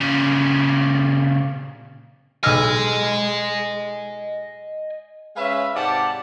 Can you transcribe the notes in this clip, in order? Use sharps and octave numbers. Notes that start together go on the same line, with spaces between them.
A#2 C#3
B1 D#5 G#5 E6 F6
G#3 C#4 B4 E5 F5
G#2 C3 G4 D5 F#5 A5